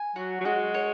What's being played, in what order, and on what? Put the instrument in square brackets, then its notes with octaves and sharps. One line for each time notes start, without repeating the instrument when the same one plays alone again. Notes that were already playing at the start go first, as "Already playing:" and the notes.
Already playing: [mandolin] G#5
[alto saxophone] F#3 [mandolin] F#4
[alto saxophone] F#3
[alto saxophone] G#3 [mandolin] F#4
[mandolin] C#5